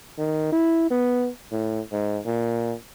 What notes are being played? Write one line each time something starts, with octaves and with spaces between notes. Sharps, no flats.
D#3
E4
B3
A2
G#2
A#2